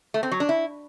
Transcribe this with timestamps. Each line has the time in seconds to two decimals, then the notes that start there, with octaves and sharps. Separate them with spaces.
0.14 A3
0.23 C4
0.31 F#3
0.40 D4
0.49 E4